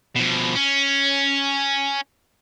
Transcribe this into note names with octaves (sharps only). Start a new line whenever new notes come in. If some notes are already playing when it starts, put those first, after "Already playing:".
B2 F3
C#4